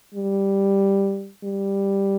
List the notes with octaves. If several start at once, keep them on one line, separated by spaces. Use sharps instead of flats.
G3
G3